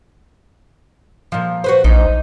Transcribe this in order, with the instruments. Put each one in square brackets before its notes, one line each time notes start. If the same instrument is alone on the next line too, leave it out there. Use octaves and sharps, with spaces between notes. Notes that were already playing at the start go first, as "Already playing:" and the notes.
[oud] A#2 F3
F#4 B4 C5
[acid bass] A#1 [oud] D#4